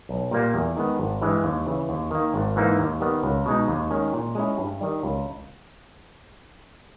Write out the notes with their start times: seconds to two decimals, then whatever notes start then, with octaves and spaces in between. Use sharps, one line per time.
0.09 B1
0.31 A#2 G3 A#3
0.54 E2
0.77 D#3 G#3 B3
1.00 G#1
1.22 G2 E3 G#3
1.44 D#2
1.67 C#3 E3
1.89 D#2
2.11 D#3 A#3
2.34 G#1
2.56 G#2 E3 A#3 D#4
2.79 D#2
3.01 D#3 G3 B3
3.23 C#2
3.46 B2 G#3 D#4
3.68 D#2
3.91 D#3 G#3 C#4
4.13 A#2
4.35 G#3 C#4 E4
4.58 G2
4.81 D#3 G3
5.03 C#2